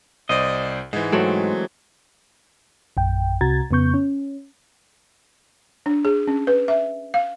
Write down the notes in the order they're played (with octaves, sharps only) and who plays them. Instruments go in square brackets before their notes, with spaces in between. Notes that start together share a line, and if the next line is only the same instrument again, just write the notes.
[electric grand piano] C2 C5 D5 [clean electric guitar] D#5
[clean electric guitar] G#2 [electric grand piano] E3 G#3
[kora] F#3 A3 C4
[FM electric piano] A#1 F#2 G5
C2 C3 F#4 A#5 G#6 A6
F2 C#3 B3 C#6 G6
C#4
[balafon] D4
G#4
C#4
B4
E5
F5